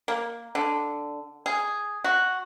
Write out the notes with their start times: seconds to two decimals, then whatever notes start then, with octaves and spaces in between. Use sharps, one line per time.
0.08 A#3
0.55 D3
1.46 G#4
2.04 F#4